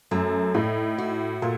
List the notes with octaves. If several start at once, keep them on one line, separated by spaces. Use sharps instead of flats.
F#2 A3
A2 D#4
F#4
A#2 A3